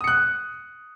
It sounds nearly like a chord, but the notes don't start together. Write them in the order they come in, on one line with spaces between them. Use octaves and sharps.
D#6 C#7 F#6